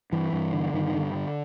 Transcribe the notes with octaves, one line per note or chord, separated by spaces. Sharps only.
G2 E3
G2
D3
G2 D#3
D3
D3